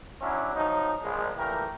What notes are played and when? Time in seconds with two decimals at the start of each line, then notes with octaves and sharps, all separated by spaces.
0.20 F#3 C#4 D4 E4
0.54 F3 F#3 D#4
1.01 A#1 G#3
1.37 A#2 E3 A3 G4 A#4